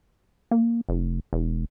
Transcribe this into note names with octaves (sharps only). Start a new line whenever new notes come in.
A#3
F1
E1